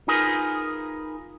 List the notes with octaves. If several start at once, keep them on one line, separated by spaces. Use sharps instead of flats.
D#4 F4 G#4 A#4 B4